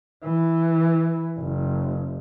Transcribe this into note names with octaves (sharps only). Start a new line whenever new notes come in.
E3
F#1